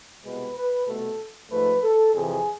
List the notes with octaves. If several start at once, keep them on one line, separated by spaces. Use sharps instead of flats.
C2 B2 G#3 B3 B4
B4
C2 B2 A3 A4
G#2 F3 A3 B4
A4
F2 C3 E3 G#4